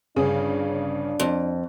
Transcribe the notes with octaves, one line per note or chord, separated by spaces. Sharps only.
G1 C#3 D4 G#4
F2